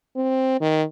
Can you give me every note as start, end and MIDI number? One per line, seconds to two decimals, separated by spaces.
0.16 0.60 60
0.61 0.83 51